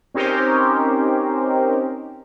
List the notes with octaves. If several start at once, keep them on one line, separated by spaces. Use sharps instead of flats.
C4 C#4 D#4 G4 A#4 C5